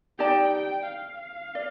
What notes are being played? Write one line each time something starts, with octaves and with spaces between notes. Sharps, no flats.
D#4 G4 D5 G5 A5
G5
F5
D5